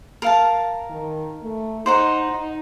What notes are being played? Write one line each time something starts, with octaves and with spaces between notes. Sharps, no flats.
A#4 F5 A5
D#3
A3
D#4 C5 F#5 A#5
D#4